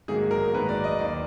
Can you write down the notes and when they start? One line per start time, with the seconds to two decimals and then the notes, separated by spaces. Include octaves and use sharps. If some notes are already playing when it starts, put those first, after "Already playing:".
0.08 G#2 D#3 F#3 A#3 G#4
0.31 A#4
0.53 G#2 D#3 F#3 A#3 B4
0.69 D5
0.84 D#5
0.99 D#2 D#3 A#3 D5